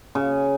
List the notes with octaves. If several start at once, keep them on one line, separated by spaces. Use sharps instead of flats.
C#3